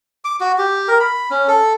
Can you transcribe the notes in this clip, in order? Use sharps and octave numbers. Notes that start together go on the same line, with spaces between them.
D6
F#4
G4
A#4
B5
C#4
A4